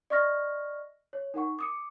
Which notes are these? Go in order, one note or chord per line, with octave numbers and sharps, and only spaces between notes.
D5 D#5 C#6 F6 A#6
C#5
D#4 A#4 F#5 C#6
D6 D#6 C#7